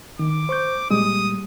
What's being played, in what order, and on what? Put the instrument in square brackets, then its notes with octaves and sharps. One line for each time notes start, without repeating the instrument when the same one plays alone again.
[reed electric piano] D#3 [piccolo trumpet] D6
[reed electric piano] C5 C#6 G6
[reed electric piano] A#2 G3 G#3 [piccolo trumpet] D#6